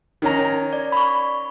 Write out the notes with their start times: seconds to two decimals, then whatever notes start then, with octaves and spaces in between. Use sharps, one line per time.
0.22 D#3 C#4 A#5
0.73 D5
0.92 B5 C#6